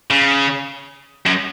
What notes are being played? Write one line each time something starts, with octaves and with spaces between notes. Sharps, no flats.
C#3
F#2